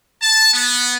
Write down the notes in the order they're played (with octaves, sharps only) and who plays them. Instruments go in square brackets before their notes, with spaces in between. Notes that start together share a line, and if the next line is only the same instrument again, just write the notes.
[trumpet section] A5
B3